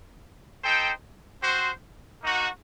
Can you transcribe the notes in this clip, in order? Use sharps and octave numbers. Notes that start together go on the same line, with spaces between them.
D#4 A4 C5 G5
C4 F#4 C5
A#3 D#4 F#4